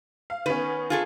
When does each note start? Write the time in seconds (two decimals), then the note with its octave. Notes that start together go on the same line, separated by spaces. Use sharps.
0.30 F5
0.46 D#3 B3 C#4 B4
0.90 F4 G#4 A4